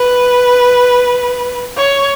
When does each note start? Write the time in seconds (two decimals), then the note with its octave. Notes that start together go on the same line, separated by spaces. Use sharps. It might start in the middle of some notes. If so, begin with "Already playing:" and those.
Already playing: B4
1.76 C#5